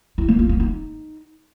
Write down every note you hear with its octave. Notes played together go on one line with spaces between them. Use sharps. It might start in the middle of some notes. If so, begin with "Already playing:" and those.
E4
A#3
F4
A#3
D#4